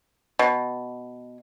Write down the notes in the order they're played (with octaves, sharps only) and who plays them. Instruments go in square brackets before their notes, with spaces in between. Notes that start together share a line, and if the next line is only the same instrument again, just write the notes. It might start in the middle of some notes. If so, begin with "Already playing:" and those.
[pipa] B2